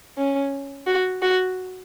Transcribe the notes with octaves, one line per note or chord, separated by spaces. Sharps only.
C#4
F#4
F#4